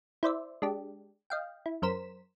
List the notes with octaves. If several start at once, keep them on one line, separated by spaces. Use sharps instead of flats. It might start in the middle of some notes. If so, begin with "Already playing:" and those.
E4 C5 D5 E5
G#3 D4 G4
D#5 F5 G5
E4
F#2 A#4 C5 B6 E7